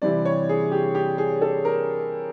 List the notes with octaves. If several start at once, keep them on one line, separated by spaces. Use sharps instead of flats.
C3 E3 G3 C4 D5
C#5
G#4
G4
G4
G#4
A4
A#4